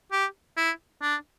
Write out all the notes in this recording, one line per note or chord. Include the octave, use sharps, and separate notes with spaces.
G4
E4
D4